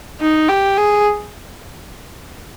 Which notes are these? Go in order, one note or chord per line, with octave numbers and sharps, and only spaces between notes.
D#4
G4
G#4